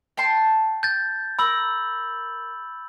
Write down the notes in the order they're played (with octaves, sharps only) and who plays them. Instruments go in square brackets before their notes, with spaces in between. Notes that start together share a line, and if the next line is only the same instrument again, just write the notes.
[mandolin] G5 A5 C6
[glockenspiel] G6 A6
[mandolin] A#4 [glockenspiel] B5 E6 F#7